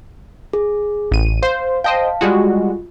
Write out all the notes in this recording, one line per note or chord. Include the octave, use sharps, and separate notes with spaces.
G#4
A1 D#7
C5 F5
C5 D#5 F5 G5 A5
G3 G#3 F4 F#4